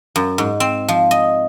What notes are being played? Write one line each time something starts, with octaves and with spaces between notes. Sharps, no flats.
F#2
G#2
C4
F3
D#5